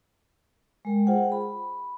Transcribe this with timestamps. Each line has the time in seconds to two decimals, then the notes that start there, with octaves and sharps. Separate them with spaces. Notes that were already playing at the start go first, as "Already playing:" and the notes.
0.85 G#3 A#4 G5
1.07 F4 G#4 C5 F#5 G5
1.32 B5